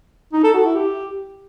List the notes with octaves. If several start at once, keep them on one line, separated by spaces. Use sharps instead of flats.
D#4
A4
F#4
E4
G4